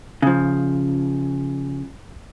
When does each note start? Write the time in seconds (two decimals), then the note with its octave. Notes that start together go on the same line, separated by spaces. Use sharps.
0.22 C#3 F3